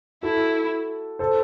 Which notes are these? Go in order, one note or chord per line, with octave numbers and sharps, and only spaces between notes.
E4 F#4 A4
A4 C5